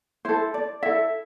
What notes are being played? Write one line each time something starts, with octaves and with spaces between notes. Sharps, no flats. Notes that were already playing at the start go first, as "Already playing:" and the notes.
E4 A4 C5
D5
E4 A4 E5